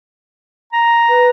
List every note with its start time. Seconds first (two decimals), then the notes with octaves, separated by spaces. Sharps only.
0.73 A#5
1.09 B4